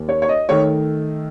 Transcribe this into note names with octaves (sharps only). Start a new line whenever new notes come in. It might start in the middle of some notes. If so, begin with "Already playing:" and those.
Already playing: D#2
C#5
C#5
D#5
D#3 A3 C#5